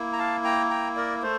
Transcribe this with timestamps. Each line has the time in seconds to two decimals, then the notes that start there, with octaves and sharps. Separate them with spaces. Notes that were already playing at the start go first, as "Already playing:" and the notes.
Already playing: A#3 E4
0.13 A#5
0.18 F5 A5
0.44 G5 A#5
0.70 G5 A#5
0.96 A#4 D5
1.22 A3 C5